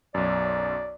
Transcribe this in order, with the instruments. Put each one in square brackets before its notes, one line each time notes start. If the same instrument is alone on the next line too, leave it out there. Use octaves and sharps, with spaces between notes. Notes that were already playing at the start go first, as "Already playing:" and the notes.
[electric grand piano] B1 F#2 [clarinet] D5